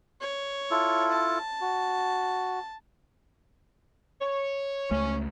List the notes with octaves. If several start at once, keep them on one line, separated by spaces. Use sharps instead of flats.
C#5
E4 F4 A4
A5
F#4
C#5
C#2 A3 C#4